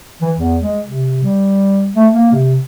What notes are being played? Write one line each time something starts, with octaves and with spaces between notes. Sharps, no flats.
E3
E2
G#3
C3
G3
A3
A#3
C3